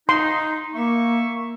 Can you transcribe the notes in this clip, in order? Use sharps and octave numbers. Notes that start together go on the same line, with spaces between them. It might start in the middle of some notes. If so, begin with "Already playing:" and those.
D#4 C6
A#3 E5 C#6